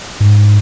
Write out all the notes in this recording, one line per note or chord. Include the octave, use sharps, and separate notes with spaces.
G#2